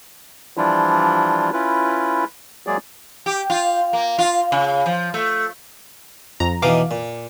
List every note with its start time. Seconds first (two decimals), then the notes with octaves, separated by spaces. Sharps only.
0.57 E3 F3 G3 D4 E4 F4
1.53 C#4 E4 F4 B4
2.67 F#3 G#3 A#3 G#4 D5
3.26 G4
3.50 F4
3.93 A#3
4.19 F4
4.52 C#3
4.86 F3
5.14 A3
6.40 F2 A#5
6.62 B2 E3 D#4 F5 D6
6.91 A#2